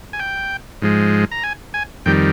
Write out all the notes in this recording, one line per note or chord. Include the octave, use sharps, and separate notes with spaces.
G#5
G5
G#2 F3 G#3
A#5
G#5
G#5
F2 D#3 G3 G5